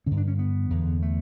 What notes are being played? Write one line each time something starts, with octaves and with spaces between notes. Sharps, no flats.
G2 D3 C#4
D4
C#4
B3
E2 D3
A3